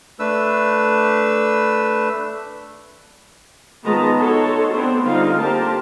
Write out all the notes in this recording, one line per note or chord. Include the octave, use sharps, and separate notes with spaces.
A3 D4 B4 E6
D#3 F3 G#3 B3 A5 A#5
D#4 F#4 A4 C#5 A5 C6
B3 C4 D4 C5
D3 G3 C4 D#4 F4 F5
A#3 G4 A#4 C5 A5